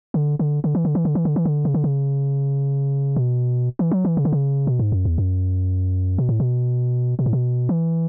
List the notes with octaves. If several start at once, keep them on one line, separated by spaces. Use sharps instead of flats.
D3
D3
D3
E3
D3
E3
D3
E3
D3
E3
D3
C#3
D3
C#3
B2
E3
F#3
E3
C#3
D3
C#3
B2
G#2
F#2
E2
F#2
B2
A2
B2
B2
A2
B2
E3